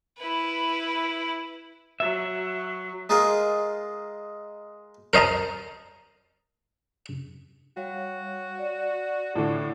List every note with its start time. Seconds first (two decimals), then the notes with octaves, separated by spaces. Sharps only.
0.18 E4 B4
2.00 F#3 E5
3.09 G#3 D#4 F4 G#4 A#4
5.13 A#4 C5 D#5 A5 A#5
7.77 G3 F#4 C#5 F5
8.59 D5
9.36 A2 D3 A4